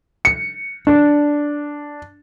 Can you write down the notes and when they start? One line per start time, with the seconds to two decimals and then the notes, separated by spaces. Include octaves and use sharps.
0.25 C#7
0.87 D4